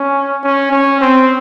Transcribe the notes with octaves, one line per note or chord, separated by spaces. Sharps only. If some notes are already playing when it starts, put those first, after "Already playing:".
Already playing: C#4
C#4
C#4
C4